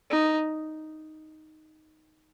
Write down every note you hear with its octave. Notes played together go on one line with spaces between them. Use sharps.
D#4